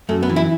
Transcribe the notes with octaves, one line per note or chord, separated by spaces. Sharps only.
F#2 A3
B3
E3
E4